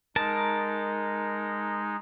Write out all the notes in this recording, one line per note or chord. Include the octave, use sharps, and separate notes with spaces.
G#3 D#4 A#4 A5